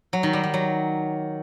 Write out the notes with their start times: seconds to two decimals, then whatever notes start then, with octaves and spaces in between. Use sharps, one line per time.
0.13 F#3
0.23 D#3
0.33 G3
0.43 G3
0.54 F#3